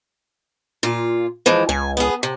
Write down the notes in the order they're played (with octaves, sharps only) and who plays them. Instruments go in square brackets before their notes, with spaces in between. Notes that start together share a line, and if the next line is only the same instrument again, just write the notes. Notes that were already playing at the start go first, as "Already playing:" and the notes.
[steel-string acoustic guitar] A#2 F4
E3 F3 G#3
[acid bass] C#2 [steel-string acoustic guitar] G#5
[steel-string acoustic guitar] B3 G#4
C3